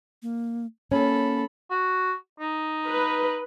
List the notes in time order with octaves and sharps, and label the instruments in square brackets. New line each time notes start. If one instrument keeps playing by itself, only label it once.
[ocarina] A#3
[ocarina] A#3 [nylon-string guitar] C#4 [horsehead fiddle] A4 B5
[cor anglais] F#4
D#4
[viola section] B4